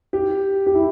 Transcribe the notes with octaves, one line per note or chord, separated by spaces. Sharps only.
G4
G4
E4